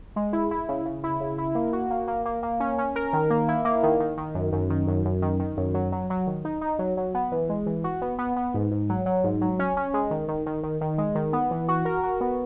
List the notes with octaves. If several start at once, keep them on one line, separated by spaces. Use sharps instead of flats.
G#3
E4
E4
C#3
C#3
E4
C#3
E4
A#3
F#4
A#3
A#3
A#3
A#3
C#4
C#4
A#4
D#3
A#3
E4
A#3
D#3
D#3
D#3
F#2
F#2
D#3
F#2
F#2
D#3
D#3
F#2
F#3
F#3
F#3
D#3
D#4
D#4
F#3
F#3
B3
E3
G#3
E3
F#4
B3
B3
B3
G#2
G#2
F#3
F#3
G#2
F#3
C#4
C#4
G#3
D#3
D#3
D#3
D#3
D#3
G#3
D#3
B3
E3
F#4
A#4
F#4
B3